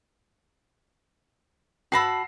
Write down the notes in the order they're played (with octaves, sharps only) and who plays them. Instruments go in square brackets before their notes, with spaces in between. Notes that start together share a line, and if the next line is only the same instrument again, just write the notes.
[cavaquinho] F#4 A5 B5 [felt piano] E6 A#6 C7